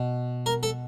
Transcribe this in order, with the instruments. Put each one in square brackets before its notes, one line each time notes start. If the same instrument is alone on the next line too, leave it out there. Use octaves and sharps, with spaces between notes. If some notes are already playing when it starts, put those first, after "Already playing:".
Already playing: [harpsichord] B2
A#4
A4